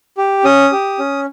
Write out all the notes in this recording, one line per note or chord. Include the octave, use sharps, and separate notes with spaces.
G4
C#4 D#6
G4
C#4